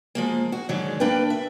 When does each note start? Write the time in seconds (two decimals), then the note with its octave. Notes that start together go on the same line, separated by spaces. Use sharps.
0.15 F3 G#3 A#3
0.52 F#4
0.69 G#2 D3 D#3 F#3 G#3
1.00 A#3 D4 A#4 B4 G5
1.30 E5